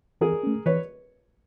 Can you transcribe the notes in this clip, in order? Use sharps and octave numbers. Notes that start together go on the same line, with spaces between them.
E3 G#4 A#4
A3 C#4
E3 B4 C#5